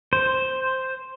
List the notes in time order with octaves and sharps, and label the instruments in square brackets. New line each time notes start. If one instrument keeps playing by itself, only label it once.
[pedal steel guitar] C5